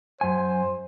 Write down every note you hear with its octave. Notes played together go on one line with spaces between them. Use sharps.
F#2 C5 G#5